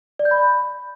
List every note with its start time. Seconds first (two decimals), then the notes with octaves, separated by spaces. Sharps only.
0.19 D5
0.25 G6
0.31 B5